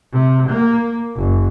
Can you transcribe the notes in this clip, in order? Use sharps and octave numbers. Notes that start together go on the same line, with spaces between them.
C3
A#3
F#1